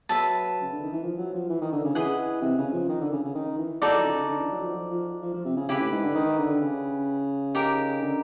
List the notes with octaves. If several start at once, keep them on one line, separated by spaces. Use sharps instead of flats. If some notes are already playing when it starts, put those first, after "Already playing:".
F#3 B4 E5 A5
C#3
D3
D#3
E3
F3
F#3
F3
E3
D#3
D3
C#3
E3 G#4 B4 D#5 F#5
C3
C#3
F3
D#3
D3
C#3
C#3
D#3
E3
D#4 F#4 A4 D5
F3
C#3
C#3
D3
E3
F#3
F3
F3
F3
F3
F3
C3
C#3
C#3 E4 G4 B4
A2
G#2
D3
D#3
D3
C#3
D#4 G4 A#4
D3